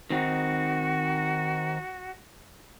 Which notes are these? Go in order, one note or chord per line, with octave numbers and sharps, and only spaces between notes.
D#3 C4 D#4 F#4